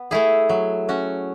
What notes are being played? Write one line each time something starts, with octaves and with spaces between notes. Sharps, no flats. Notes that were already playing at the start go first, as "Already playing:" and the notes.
Already playing: B3
A3 E4 G#4
F#3
C#4 F#4